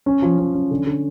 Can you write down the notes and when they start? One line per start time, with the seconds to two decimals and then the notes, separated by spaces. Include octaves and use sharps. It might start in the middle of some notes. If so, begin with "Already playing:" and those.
0.06 C#4
0.22 F3
0.38 C#4
0.55 C#4
0.71 D3
0.87 D3